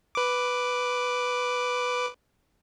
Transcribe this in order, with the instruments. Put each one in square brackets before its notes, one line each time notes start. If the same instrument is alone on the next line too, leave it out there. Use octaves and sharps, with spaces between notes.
[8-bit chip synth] B4 D6